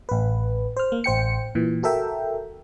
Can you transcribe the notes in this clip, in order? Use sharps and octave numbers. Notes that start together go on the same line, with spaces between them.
A1 B4
C5 F6
A#3
A1 C5 G5 C#7
A#2 E3
F#4 A4 A#4 E5 G5